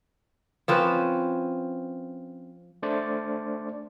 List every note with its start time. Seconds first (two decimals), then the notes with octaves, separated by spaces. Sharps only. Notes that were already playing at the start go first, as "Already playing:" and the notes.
0.68 F3 C4 C#4 B4
2.83 A3 D4 C5 D5